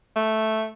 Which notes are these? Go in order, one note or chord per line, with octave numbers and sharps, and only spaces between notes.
A3